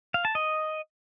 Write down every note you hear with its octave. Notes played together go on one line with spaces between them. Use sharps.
F5
A5
D#5